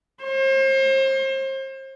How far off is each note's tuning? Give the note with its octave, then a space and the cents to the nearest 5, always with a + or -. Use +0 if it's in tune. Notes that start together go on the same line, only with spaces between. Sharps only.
C5 +35